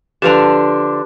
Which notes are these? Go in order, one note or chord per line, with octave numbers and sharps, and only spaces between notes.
D3 F3 D4 G4 B4 F7